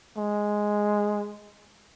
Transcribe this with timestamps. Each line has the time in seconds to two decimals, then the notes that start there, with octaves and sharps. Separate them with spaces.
0.18 G#3